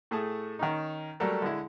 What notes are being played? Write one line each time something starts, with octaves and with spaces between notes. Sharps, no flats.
A2 A3 G#4 A5
D#3 C#4 D#4
F#3 G3 A3 A4 A#4
D3 G#3 E4